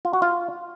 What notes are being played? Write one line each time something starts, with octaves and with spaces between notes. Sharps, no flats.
F4
F#4
F4